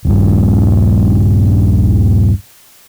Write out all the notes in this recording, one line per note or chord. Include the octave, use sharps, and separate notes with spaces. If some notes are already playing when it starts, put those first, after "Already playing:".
D#1 A#1 G2